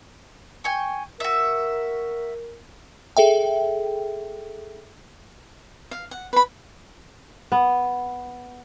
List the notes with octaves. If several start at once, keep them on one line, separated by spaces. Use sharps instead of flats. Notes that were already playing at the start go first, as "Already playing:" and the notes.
G5 G#5 C#6
F#4 A#4 E5
G#4 A4 E5 G5
F5
F#5
B4 B5
B3